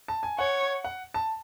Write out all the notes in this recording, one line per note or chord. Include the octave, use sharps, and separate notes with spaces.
A5
G#5
C#5 F#5
F#5
A5